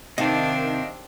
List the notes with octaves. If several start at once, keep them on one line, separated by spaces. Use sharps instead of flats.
C3 D#3 C4 D4 D#5 F5 A5